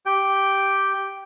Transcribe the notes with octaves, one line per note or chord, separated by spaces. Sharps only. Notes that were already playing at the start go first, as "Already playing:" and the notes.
G4 G5